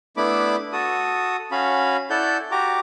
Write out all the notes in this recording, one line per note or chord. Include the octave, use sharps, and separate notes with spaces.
A3 B3 D4 E4 B5 D6
F#4 A4 D#6
C#4 F#4 F5 B5
E4 A4 D5 F#5 G6
F#4 G4 A#5 D6